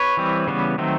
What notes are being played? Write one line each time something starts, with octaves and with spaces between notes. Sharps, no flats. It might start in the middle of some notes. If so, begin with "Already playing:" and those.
Already playing: B4 C#5
E3 G3 C4
C#3 E3 G3 B3
D#3 F#3 A3 C4